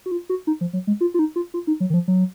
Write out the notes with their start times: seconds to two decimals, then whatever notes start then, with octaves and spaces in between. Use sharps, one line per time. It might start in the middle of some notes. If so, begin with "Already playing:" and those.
0.06 F#4
0.11 F4
0.29 F#4
0.47 D#4
0.61 F3
0.73 F#3
0.87 G#3
1.01 F4
1.14 F4
1.19 D#4
1.36 F4
1.54 F4
1.67 D#4
1.80 F#3
1.90 D#3
1.94 F3
2.08 F#3